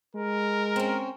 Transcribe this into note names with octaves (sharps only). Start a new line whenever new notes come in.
G#3 A#4
C4 C#4